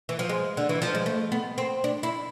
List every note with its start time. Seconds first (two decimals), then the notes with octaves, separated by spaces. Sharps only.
0.09 E3
0.19 F3
0.29 G#3
0.57 D3
0.69 E3
0.82 F3
0.95 G#3
1.06 A3
1.32 B3
1.58 C4
1.84 D4
2.03 E4